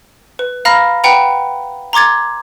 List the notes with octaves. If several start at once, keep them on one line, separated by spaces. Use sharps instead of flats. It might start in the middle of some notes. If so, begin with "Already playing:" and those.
B4
F5 A#5 B5 F6 A#6
B4 F#5 G5 A#5 B5
A#5 C6 D6 G#6 A6